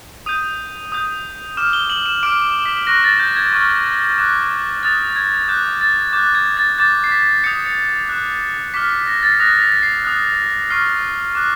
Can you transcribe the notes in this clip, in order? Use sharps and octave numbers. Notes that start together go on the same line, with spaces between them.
D#6 G6 D#7
D#6 G6
D6 F6 E7
G7
F#7
E7
D6 F6 D7
B6
C#6 F#6 A#6
A6
G6
G#6
C#6 F6
D6 F#6
D#6 F#6 A6
G#6
D6 F#6 G6
A6
D6 G6
F#6
G#6
A6
D6 G6 A6
C7
B6
D#6 G6 C#7
C#7
D6 F#6
D6 F6 B6
B6
A#6
A6
B6
D#6 F#6 A#6
B6
C7
D#6 F#6
C#6 F6 C7
D6 F#6